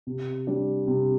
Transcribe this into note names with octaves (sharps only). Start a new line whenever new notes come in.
C3
G3 D4
C3